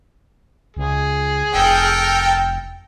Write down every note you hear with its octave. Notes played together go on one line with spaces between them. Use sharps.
C#2 G#4
F1 A4 A#4 G5